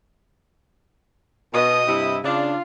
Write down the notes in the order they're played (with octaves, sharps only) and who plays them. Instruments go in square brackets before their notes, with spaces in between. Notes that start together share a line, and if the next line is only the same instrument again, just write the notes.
[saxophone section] B2 [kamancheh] D#5 D#6
[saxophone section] G2 C3 E4
[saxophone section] C#3 D4 [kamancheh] F4